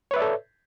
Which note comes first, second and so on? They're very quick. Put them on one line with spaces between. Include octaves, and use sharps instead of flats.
C#5 B4 E5 D5 A4